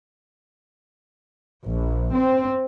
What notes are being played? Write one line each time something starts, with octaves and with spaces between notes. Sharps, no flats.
A#1
C4